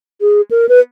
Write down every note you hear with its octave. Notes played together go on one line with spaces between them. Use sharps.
G#4
A#4
B4